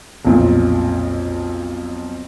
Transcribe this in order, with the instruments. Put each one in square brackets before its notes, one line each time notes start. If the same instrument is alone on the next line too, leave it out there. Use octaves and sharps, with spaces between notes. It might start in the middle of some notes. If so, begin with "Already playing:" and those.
[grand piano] B1 F2 A#2